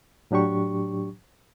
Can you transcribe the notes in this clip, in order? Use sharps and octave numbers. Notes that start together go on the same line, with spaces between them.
A2 F#3 D4 G4 C#6